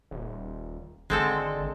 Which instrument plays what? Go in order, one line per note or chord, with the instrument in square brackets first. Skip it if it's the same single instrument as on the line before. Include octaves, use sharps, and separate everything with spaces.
[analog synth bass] D#1
[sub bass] G#1 [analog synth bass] D3 [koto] G#3 C4 A4